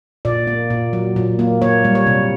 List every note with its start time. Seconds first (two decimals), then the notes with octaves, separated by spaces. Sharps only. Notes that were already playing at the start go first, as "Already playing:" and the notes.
0.25 A#2 D5
0.47 A#3
0.70 A#2
0.93 F#3
1.16 A#2
1.39 A#3
1.62 A#3 C#5
1.84 G3
1.95 C#5
2.07 C3